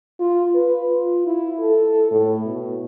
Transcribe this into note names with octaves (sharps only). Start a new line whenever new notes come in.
F4
B4
F4
E4
A4
A2
B2